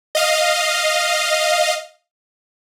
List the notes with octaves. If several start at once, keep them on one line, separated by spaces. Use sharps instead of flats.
D#5 F5